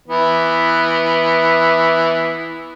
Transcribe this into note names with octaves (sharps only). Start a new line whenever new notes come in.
E3 B3